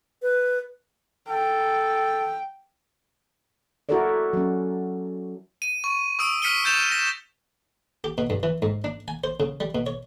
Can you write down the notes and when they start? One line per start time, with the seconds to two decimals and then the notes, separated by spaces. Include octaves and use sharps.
0.22 B4
1.29 A4 G5
3.89 E4 F#4 A4 A#4 C#5 D5
4.33 F#3 C#4
5.62 D#7
5.84 C#6
6.19 C#6 D#6 E6 D7
6.42 F6 B6 C#7 D#7 G7
6.64 D#6 G6 A6 E7 F7
6.92 A#6
8.04 G4
8.18 B2
8.30 G2
8.43 E3
8.62 G#2
8.84 D4
9.08 G#5
9.24 C5
9.40 C#3
9.60 G3
9.75 B2
9.87 C#5